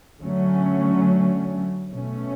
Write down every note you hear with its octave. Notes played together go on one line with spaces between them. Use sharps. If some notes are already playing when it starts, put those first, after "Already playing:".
D3 F#3 A3 C#4
B2 A3 C#4